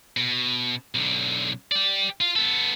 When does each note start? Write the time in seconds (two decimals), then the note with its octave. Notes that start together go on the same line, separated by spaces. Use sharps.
0.17 B2
0.95 B1 D3
1.72 G4 D5
2.21 F4
2.36 B3 A4